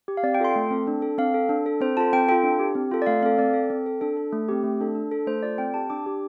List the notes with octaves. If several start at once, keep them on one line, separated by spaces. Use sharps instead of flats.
G4
F5
C4 D5
G5
F4 A4 C6
A3
C4 A4
D4
A4
C4 F5
A4
D4
A4
C4 C5
F4 A4 A5
C4 G5
F4 A4 G5
D4
G4
C4
F4 A4
D5
A3 F5
C4 A4 F5
C4 D5
A4
C4
A4
D4 A4
A4
A3
C4 G4
A3
D4 A4
D4
A4
A3 C5
F4 A4 D5
C4 G5
G4 A5
D4 D6
G4